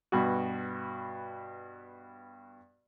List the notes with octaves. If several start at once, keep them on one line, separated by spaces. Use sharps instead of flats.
G2 B2 F#4